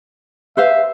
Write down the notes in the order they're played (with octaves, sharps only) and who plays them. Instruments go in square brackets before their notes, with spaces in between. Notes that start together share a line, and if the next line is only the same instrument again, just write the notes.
[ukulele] B4 C5 F5 [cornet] E5